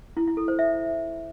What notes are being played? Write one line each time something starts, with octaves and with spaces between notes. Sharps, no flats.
E4
E4
A4
C5
E5